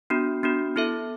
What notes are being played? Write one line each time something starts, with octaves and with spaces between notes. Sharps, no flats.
B3 D4 F#4
B3 D4 F#4
B3 E4 A4 E5